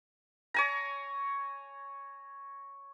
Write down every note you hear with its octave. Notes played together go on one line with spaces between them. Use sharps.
C#5 G#5 A#5